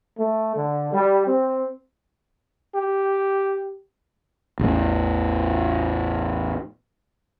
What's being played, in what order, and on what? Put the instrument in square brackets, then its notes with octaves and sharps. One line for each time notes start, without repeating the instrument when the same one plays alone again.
[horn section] A3
D3
G3
C4
[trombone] G4
[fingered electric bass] A1 E2 A2